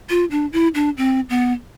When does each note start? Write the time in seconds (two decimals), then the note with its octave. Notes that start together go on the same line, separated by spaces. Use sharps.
0.10 F4
0.31 D4
0.53 E4
0.75 D4
0.97 C4
1.30 B3